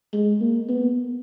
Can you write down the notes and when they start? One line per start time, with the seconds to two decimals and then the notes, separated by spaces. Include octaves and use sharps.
0.13 G#3
0.41 A#3
0.69 B3